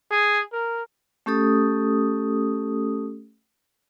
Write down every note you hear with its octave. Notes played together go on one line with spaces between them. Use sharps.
G#4
A#4
A3 C#4 G4 A4 D#6